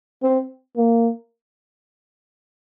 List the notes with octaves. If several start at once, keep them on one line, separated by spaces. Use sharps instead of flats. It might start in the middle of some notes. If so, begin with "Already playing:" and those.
C4
A#3